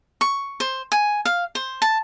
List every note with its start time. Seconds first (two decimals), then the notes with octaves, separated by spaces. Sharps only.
0.21 C#6
0.60 C5
0.92 G#5
1.25 F5
1.55 C5
1.82 A5